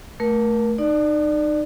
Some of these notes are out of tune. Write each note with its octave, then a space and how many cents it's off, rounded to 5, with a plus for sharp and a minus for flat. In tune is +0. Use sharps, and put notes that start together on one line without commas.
A3 +0 A#4 +30
D#4 -30 D5 +15